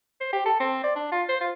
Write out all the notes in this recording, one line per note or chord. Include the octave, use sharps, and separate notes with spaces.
C5
G4
A4
C4
D5
D4
F4
C5
F4